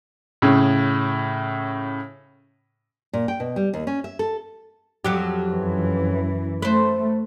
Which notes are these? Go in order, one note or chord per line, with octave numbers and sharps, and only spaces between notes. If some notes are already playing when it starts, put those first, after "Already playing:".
A2 C#3
A#2
G5
B2
G3
D#2
C#4
E5
A4
F2 F#3 G4
F#2 E3
A3 B4 C5